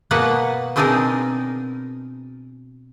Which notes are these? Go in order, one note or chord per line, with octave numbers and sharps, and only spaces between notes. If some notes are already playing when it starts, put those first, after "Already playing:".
B2 A#3 B3 F#4 B4 F#5
B2 C4 D4 D#4 G#4 A#4